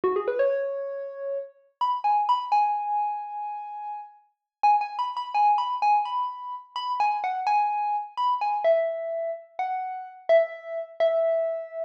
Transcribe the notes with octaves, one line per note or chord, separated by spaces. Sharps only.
F#4
G#4
B4
C#5
B5
G#5
B5
G#5
G#5
G#5
B5
B5
G#5
B5
G#5
B5
B5
G#5
F#5
G#5
B5
G#5
E5
F#5
E5
E5